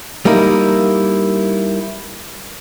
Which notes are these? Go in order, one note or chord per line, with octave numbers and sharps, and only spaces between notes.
G3 A#3 D#4 E4